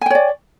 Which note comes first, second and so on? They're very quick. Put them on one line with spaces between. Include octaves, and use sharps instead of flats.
G#5 G5 C#5 D5